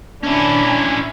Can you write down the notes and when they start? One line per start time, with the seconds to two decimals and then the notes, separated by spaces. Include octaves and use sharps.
0.23 C#4 D4 E4 G#5